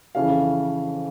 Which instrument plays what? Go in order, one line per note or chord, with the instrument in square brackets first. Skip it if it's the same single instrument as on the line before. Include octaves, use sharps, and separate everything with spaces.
[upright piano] F2 C#3 E3 F5